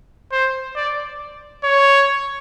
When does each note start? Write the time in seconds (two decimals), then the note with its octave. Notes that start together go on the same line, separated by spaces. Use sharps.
0.32 C5
0.76 D5
1.64 C#5